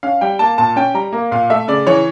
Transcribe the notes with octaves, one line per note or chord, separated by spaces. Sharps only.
C#4 F5
G3 G5
A#3 A5
A#2 A5
C#4 G5
G3 A#5
A#3
A#2 F5
A3 E5
C#3 D5
E3 C#5